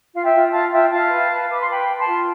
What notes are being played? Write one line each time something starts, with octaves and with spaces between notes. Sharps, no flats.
F4 F5
E5 G5
F4
F4 F5 A5
F4 E5 G5
F4 F5 A5
B4
B4
B4 D6
C6
B4 G5 B5
B4
A5 C6
F4